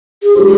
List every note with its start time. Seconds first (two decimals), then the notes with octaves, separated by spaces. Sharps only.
0.23 G#4
0.35 G#3 D4 F4 G4 C5